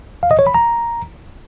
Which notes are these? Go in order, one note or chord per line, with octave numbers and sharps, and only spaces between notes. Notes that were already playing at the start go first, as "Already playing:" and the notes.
F5
D#5
C#5
B5
A#5